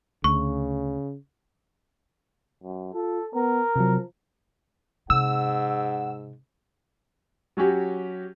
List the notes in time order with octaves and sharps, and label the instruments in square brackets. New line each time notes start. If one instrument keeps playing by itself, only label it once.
[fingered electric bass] D2 [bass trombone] C#3 [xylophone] C#6
[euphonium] F#2
[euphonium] F4 [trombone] A4
[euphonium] B3 [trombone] A#4
[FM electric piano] C3 F#3 [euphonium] F3
[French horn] G#2 [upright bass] C3 [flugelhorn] F#5 [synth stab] E6
[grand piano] F#3 C#4 F#4 G4